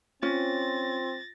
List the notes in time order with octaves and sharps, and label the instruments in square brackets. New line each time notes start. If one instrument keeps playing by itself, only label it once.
[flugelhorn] C4 [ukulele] C#4 [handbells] F4 [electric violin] A6 A#6